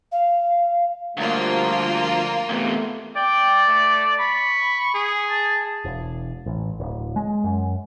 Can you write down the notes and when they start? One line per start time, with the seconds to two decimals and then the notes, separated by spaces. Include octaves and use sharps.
0.11 F5
1.17 D2 F3 G3 A#3 F4
2.49 E2 C3 A3 B3
3.16 D5 G5
3.68 A3
4.19 B5 C#6
4.94 G#4
5.30 A5
5.85 E1
6.46 A1
6.80 D1
7.16 G#3
7.44 F#2